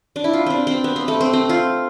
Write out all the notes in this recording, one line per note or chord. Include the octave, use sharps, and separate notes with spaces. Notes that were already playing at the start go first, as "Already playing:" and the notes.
D4
E4
F4
C4 D4
C4
B3
C4
A3
C4
C4
F4